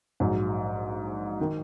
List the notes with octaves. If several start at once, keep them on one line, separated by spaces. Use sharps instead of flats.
A#1 G#2 F#3
D#3